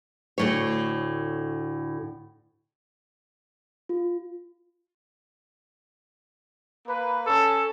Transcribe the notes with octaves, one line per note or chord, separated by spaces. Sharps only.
D2 A2 C#5
F4
A#3 B4
C#4 A4